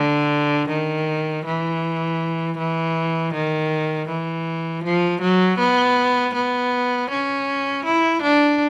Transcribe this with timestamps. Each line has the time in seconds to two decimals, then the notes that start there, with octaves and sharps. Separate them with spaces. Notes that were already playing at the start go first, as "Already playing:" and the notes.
Already playing: D3
0.69 D#3
1.45 E3
2.58 E3
3.34 D#3
4.09 E3
4.84 F3
5.22 F#3
5.59 B3
6.34 B3
7.10 C#4
7.85 E4
8.22 D4